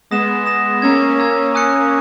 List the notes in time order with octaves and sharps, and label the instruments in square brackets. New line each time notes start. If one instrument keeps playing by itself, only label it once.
[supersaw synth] G#3 B3 [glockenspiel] D#6 A#6 E7
[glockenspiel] D#6 A#6 E7
[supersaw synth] A#3 C#4 [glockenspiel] A#5 E6 G#6
[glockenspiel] A#5 E6 G#6
G#5 D#6 F#6 C#7